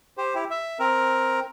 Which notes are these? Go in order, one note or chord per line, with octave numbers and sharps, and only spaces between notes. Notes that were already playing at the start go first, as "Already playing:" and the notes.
G4 C5
E4 G4
E5
C4 A#4